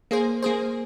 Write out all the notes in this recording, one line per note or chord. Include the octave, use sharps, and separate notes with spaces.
A#3 G#4 C5
A#3 G#4 C5